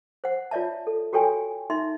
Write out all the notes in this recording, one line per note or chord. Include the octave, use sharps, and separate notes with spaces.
C5 F#5
F4 C#5 D5 E5 A5
A4
F#4 G4 A4 C#5 G5 G#5
D#4 E5 C6